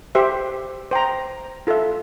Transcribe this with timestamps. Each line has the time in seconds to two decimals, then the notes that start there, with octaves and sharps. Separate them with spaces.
0.15 G4 C5 E5
0.91 C5 G5 A#5
1.67 F4 A4 E5